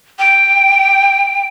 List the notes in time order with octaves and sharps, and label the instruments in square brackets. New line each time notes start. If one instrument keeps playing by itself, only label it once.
[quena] G5